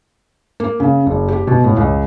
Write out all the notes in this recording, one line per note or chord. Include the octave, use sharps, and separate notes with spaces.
A#3
C#3
F#1
G4
B2
A2
C#2